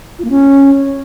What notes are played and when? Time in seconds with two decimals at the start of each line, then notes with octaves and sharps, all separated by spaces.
0.19 F4
0.24 A#3
0.30 C#4